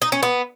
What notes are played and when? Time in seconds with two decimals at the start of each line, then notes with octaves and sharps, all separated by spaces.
0.02 D#4
0.12 C#4
0.23 B3